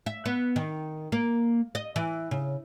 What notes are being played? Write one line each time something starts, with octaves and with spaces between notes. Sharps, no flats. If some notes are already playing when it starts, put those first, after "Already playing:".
E5
B3
D#3
A#3
D#5
E3
C#3